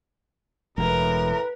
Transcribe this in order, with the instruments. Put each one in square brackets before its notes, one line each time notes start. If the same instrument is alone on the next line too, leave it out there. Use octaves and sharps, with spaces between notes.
[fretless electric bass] E1 [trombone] A2 [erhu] A#4 [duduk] B4